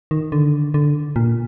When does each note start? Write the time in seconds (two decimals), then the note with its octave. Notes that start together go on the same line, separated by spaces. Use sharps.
0.11 D#3
0.32 D3
0.74 D3
1.16 A#2